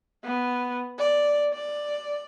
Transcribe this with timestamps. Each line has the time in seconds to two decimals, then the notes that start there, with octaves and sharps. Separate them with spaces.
0.24 B3
0.98 D5
1.53 D5